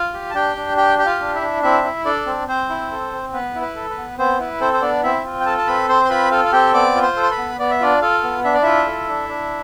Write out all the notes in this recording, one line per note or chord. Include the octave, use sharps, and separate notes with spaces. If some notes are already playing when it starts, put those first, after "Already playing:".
Already playing: F4 F5
G4
A5
D4 G4 G5
D4
G4 G5
G4 G5
F4 F5
D4
E4 E5
D4
C4 E4 E5
E4
D4 A4 D5
C4
C4 C5
E4
A4
C4
B3 B4
E4
B4
A4
B4
B3
B3 C4 C5
E4 B4
C4 A4 C5
C5
B3 D4 D5
C4 E4 E5
F4
G5
A4 A5
A5
C4 B4 B5
C4 C5 C6
C6
F4 B4 B5
F4 A4 F5
F5
C4 G4 G5
B3 D5 D6
F4
C5 C6
A4
C6
B4 B5
B3
B3 D5
E5
D4 F4 D5
F4 A4 F5
B3
D4 E5
D5
E4 F4 E5
A4
D4
D4